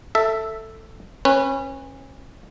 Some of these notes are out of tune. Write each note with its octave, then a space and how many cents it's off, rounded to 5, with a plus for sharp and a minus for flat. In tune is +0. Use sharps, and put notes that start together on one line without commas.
A4 +10 E5 +0
C#4 -30 B4 +0